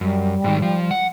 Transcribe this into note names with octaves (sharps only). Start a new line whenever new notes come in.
F#2 G3
G#2 D#3
F3
F#5